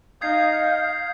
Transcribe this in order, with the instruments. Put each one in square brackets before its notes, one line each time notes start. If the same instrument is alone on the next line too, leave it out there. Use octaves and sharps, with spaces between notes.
[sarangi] D#4 [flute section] F5 G6 [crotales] D#6 G#6 C7